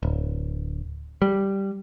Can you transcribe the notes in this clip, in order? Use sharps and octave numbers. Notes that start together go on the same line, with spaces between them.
D1
G3